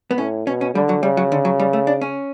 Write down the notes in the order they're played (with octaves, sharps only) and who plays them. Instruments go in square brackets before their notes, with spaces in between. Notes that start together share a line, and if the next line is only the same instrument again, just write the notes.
[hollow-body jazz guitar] B3
[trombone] A2 [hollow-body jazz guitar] C#4
[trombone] B2 [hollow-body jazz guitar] C#4
[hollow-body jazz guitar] C#4
[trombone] D3 [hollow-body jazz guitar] G3
[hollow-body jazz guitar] F#3
[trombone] C#3 [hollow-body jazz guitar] G3
[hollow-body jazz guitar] F#3
D3
F#3
G3
A3
D4
C#4